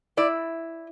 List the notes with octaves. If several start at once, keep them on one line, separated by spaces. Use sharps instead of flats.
E4 D5